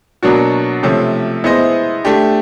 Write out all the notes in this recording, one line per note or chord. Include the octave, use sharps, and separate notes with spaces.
B2 F#3 A#3 D4 F#4
C3 F3 A3 C#4
B3 E4 G#4 C5 D#5
A3 D4 G4